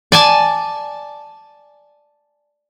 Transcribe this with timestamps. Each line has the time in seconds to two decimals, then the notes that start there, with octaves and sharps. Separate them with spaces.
0.12 D5 G#5 A5